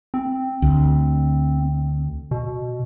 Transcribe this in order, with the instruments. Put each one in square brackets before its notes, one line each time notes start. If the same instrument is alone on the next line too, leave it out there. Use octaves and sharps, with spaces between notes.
[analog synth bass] C4
[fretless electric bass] D2
[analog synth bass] B2